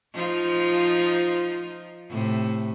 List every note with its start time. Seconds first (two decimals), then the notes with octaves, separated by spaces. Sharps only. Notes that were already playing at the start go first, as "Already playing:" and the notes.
0.15 F3 D#4 F4
2.10 A2 C3